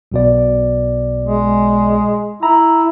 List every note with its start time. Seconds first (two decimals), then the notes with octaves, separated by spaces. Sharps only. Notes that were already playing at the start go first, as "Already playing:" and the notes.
0.12 B1 B2 D5
1.24 G#3
2.43 E4 A#5